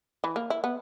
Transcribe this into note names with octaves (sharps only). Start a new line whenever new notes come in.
E3
A#3
E4
B3